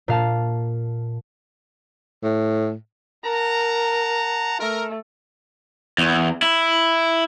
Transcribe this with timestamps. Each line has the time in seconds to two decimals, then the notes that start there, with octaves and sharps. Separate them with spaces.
0.08 A#2 F5 A5
2.23 A2
3.24 A#4 F#5 A5 A#5
4.59 A3 A#4
5.98 E2
6.42 E4